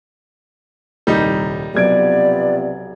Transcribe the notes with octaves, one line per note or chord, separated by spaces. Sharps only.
D#1 C2 G3 D#4
B1 C3 F3 B3 D5 G#6 D7